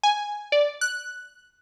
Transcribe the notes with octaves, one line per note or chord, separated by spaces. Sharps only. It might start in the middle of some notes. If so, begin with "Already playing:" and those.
G#5
D5
F#6